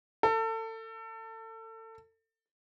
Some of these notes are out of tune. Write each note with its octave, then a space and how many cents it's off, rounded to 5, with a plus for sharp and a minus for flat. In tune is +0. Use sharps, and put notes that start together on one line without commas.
A4 +30